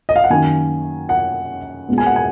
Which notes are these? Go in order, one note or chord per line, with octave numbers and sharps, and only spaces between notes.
D#5
F5
F#5
F#2 D#3 A#3 G#5
F#5
A#2 G#3 B3
G#5
F#5
G#5